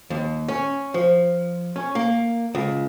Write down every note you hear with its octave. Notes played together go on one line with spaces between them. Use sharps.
D#2
C#4
F3
C#4
A#3
C#2